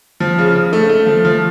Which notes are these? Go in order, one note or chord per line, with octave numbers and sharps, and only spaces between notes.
F3
C#3
C#3
A3
A3
F3
F3